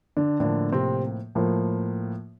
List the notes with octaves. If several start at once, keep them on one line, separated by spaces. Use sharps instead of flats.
D3 D4
A2 D3 F3 A#3 D4
C3 C4
A2 F3 A#3